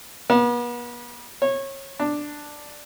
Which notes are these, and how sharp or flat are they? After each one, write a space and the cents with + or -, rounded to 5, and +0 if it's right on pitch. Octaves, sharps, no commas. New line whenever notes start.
B3 -45
C#5 -25
D4 +5